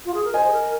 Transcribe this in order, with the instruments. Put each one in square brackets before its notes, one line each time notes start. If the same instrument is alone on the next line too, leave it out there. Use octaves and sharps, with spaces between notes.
[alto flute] F4
G#4
A#4
[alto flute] C5 [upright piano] D#5 G#5
[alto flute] G#4
A#4